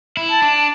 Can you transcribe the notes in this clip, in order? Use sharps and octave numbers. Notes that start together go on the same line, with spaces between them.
E4
A5
D4